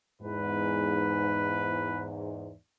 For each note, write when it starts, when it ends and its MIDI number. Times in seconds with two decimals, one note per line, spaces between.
0.22 2.51 40
0.22 2.51 44
0.22 2.07 71